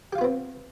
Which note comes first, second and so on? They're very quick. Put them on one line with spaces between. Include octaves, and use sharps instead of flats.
G4 F5 F4 B3 C4